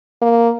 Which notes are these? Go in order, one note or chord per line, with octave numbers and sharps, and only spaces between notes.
A#3